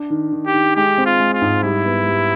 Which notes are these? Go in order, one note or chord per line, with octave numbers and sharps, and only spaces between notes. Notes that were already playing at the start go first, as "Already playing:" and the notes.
Already playing: D4
D#3
D#3
G4
D#3
G#3 G4
C4
F4
G#3
F4
G#2
G3 E4
B3
G3